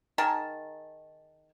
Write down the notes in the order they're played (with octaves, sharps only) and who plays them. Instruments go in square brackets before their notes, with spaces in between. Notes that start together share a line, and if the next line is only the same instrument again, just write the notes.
[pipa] D#3 G#4 A#4 A5